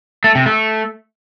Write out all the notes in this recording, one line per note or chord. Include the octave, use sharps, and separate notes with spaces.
A3
C3
A3